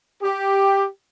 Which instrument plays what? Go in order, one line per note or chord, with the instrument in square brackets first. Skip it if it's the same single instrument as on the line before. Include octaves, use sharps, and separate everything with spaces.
[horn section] G4